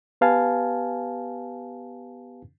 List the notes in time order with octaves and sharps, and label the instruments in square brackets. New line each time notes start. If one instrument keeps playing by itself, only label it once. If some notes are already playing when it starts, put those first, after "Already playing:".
[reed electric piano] B3 G4 B4 F5 G#5 A5